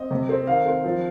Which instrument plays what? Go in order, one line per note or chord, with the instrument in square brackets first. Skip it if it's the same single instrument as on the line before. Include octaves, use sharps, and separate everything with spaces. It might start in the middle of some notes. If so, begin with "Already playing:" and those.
Already playing: [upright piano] C4 D#5
C3
C4
D#3 F5
C4
F3